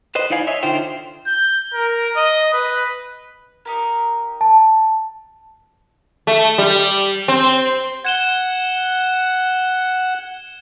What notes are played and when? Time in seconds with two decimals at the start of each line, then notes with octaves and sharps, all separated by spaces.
0.15 B4 C5 D#5
0.30 D#4 E4 D5 F5 G5 G#5
0.47 C#5 D#5 E5
0.63 D3 D4 D#4 F4 C5 G5
1.27 G6
1.74 A#4
2.17 D#5
2.53 B4
3.65 D#4 G4 A#4
4.41 A5
6.27 A3
6.58 G3
7.28 C4
8.05 F#5 G#6 E7 G7